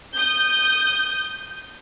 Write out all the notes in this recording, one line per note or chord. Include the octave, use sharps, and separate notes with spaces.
D#6 G6